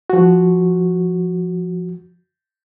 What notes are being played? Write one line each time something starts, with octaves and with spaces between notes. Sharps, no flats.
F3 F#4